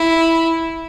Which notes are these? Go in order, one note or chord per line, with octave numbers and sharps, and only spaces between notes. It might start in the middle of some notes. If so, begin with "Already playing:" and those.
Already playing: E4